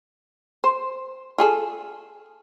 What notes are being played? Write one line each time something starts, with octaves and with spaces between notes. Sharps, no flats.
C5
F4 G#4 A4